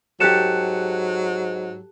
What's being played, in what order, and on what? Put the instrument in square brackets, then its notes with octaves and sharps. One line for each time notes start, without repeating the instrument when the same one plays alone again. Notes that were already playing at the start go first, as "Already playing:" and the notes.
[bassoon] G#2 [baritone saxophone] F#3 [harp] G4 A4 [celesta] F#6 C#7 E7